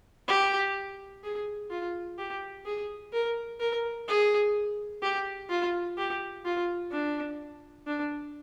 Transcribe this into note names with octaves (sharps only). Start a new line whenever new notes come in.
G4
G#4
F4
G4
G#4
A#4
A#4
G#4
G4
F4
G4
F4
D4
D4